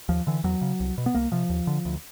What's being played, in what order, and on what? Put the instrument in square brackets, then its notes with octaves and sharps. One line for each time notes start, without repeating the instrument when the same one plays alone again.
[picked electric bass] D#2 F3
D3 E3
E2 F#3
C#3
C2
B2
B3
C2 A#3
C3 F3
D#2
D3
D2